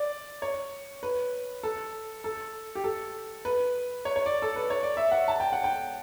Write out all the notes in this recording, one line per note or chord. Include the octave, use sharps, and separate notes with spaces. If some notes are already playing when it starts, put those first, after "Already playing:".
Already playing: D5
C#5
B4
A4
A4
G4
A4
B4
C#5
C#5
D5
A4
B4
C#5
D5
E5
F#5
A5
G5
F#5
G5